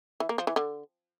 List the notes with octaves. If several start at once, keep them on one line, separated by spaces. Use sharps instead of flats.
E3
A#3
F3
E3
D3